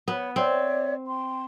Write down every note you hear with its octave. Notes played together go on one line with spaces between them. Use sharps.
B3 C#5 F#5 B5
C4 C#5 D5 E5
G5 C6